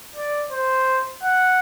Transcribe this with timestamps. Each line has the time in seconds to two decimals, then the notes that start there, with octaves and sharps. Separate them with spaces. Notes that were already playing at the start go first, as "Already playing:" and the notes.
0.16 D5
0.52 C5
1.23 F#5